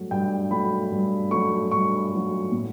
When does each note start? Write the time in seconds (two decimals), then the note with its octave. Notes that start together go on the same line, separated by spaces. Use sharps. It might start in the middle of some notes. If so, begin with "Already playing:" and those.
Already playing: G2 F#3 A3
0.11 G2 G5
0.51 F#3 A3 B5
0.92 G2
1.31 F#3 A3 C#6
1.71 G2 C#6
2.12 F#3 A3
2.52 A2